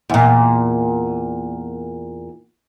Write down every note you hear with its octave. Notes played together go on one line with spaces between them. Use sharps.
E2 A#2